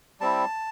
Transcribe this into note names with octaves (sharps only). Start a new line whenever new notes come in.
G3 C4 E4 A5